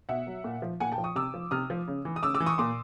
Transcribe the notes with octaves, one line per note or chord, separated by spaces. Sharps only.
B2 E5 F#5
F#3
A#2
F3
A#2 F#5 G#5
G5 A5
F3
C#6 D#6
C3 D6 E6
F3
C3 D#6 F6
F3
C#3
E3
D#6
C#3 D6 E6
D6 E6
E3
C#6 D#6
A#2 C6 D6